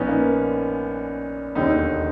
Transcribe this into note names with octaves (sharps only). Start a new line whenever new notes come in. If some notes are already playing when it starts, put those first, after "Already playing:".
Already playing: A#1 A#2 B3 C#4 D#4
A#3
E1 D#2 D3 D#4